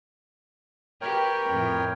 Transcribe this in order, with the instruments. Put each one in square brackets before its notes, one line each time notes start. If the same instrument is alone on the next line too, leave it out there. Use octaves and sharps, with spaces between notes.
[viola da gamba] G4 B4 [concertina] A#4 C#5 G5
[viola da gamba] F2 A2